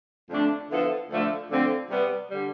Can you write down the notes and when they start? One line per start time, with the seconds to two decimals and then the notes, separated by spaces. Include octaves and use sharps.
0.30 F2 D3 A3 D4
0.70 D3 F3 B3 E4 A4
1.10 D2 D3 F3 A3
1.50 D2 D3 F3 C4
1.90 C3 G3 B3
2.30 D3 G3